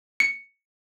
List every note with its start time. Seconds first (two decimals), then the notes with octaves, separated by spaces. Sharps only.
0.20 C#7